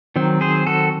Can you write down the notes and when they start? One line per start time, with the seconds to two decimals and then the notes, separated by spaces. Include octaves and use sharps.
0.16 D#3 F#3 C4
0.41 G#4 C5
0.67 F#4 A4